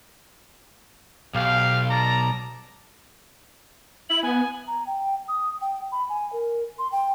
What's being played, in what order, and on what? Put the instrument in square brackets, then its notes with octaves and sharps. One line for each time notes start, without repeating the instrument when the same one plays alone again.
[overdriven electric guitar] B1 [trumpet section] G4 F5
[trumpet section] D5 A5 A#5
[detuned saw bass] E4 [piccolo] F#7
[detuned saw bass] B3 [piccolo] G#5
[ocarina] A#5
G5
D#6
G5
B5
G#5
A#4
C6
G5